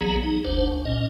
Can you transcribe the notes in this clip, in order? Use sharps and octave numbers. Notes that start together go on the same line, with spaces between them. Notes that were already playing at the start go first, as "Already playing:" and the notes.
A#1 E3 F#3 B3 G#4 A#5
D#4
F#1 D2 D4 C5
C#2
A#2 C#4 D#5